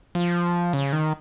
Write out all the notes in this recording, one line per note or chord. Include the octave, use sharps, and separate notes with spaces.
F3
C#3
D#3